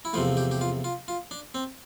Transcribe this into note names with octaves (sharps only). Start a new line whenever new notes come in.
E4
E2 C3 F3 A3 F4
G4
G4
F4
F4
F4
D4
C4